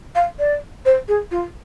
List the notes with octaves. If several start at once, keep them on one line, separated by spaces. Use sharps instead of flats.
F5
D5
C5
G#4
F4